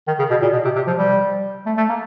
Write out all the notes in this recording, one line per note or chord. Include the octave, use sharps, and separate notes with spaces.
D#3
C#3
B2
A#2
B2
C3
C3
F3
G3
A3
A3
A#3